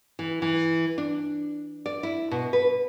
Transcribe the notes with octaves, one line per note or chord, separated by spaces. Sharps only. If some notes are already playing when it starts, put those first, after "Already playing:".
E3
E3
D4
D5
E4
B2
B4